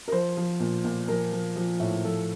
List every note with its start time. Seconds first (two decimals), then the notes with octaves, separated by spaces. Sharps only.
0.08 A#4
0.12 F3 C5
0.37 F3
0.60 A#2
0.84 A#2
1.08 F3 A#4
1.32 F3
1.56 F3
1.80 A2
2.04 F3 A4